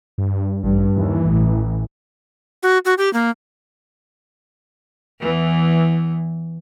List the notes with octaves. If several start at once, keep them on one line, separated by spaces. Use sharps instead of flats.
G2
A1 G2
D#2 E3
A1
F#4
F#4
G4
A#3
E2 E3